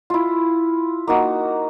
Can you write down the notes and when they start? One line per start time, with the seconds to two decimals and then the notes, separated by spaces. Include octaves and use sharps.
0.10 E4 F4
1.07 A#3 D#4 F#4